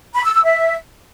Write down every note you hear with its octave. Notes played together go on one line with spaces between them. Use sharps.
B5
E6
E6
E5